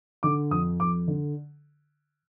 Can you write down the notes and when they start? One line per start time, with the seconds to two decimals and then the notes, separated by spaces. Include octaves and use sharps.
0.23 D3 D6
0.51 F2 D#6
0.80 F2 D6
1.08 D3